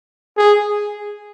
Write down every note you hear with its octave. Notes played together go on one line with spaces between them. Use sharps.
G#4